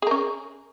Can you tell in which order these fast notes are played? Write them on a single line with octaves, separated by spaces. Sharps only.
G#4 A#4 C#4